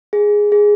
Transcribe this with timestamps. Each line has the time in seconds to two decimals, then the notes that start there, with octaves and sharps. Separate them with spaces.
0.13 G#4
0.52 G#4